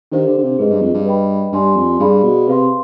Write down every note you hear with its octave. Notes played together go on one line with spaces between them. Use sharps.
D#3 D4 G4 C5 F5
D3
D3
C3
G#2 G#4 B4 D#5
G2
F2
G2
B4 D#5 G5 B5
G2 G4 D5 G#5 C6
F2
G2 G#4 D5 F5 B5
B2
C3 B4 F5 C6